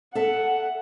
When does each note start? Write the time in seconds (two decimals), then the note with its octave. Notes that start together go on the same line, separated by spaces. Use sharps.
0.15 A4 E5 F#5 A5